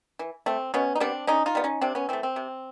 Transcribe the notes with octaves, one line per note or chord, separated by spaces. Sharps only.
E3
A3 C4
B2 B3 C#4
D#4
G3 B3 C4 D4
D3 C#4 D#4
D#4 F4
G3 B3
C#4 D#4
C3 C4 D4
B3 C#4
E3 A3 C4
C4
C3